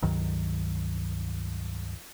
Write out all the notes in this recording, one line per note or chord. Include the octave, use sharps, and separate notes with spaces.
C#2 G2 D#3 F#3